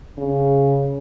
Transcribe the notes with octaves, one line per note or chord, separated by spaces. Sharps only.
C#3